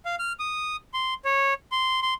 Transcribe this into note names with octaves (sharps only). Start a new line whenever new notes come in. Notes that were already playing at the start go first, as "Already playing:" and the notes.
F5
F6
D#6
C6
C#5
C6
C6